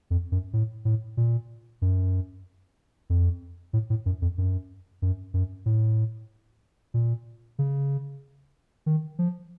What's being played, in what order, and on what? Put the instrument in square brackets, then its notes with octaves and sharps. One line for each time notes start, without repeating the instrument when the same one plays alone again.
[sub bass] F2
F#2
A2
A2
A#2
F#2
F2
A2
A2
F#2
F2
F#2
F#2
F#2
A2
A#2
C#3
D#3
F3